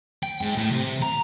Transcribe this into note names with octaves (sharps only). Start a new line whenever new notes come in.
G5
G#2
A2
C3
A#5